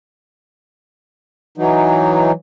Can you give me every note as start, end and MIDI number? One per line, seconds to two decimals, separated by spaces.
1.58 2.31 52
1.58 2.31 54
1.58 2.31 63